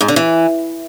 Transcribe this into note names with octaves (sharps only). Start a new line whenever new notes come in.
G#2
D3
E3